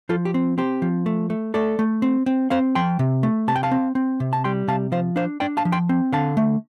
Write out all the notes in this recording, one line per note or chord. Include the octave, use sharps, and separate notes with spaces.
F3 F4 A4
G4
C4
C4 G4 C5
F3
A3
A3
A3 A4 D5
A3
C4
C4
C4 C5 F5
F3 G5 C6
C3
A3
C3 A5
G5
F5 A5
C4
C4
C3
A5
G3 G5 C6
C3 F5 A5
F3 C5 F5
D4 C5 F5
D4 D5 G5
F5 A5
F3
G5 C6
C4
D3 F5 A5
A3